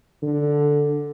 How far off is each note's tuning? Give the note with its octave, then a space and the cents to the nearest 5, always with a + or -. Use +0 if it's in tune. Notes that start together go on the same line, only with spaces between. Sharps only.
D3 +0